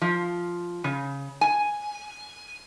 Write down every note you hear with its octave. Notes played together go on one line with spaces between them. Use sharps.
F3
C#3
G#5